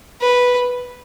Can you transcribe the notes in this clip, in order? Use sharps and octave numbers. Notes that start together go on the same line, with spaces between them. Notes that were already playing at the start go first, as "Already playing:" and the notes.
B4